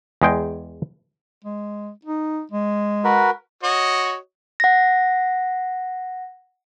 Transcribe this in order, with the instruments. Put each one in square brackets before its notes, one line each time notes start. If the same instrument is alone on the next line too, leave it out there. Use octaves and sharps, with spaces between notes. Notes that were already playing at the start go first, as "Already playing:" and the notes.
[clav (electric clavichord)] E2 G#3 G5
[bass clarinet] G#3
D#4
G#3
[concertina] F#4 A#4 B4
[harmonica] F#4 C#5 D#5
[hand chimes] F#5 A#6